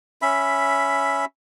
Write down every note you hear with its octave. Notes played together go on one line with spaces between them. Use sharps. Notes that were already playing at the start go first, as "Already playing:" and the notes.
C#4 E5 B5